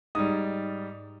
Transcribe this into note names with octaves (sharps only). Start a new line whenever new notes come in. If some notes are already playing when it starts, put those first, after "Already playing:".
G#2 G3 D#6